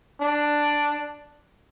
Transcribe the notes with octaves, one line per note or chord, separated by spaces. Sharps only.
D4